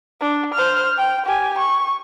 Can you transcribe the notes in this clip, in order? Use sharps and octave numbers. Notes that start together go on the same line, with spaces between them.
D4
C5 F6
G5
G4 G#5
C#6